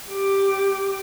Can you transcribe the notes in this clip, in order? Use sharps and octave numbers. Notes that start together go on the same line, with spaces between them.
G4 D6